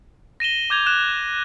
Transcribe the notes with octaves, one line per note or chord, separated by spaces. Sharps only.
A#6 D#7 E7 G7
D6 G6 G#6 F7
F#6 E7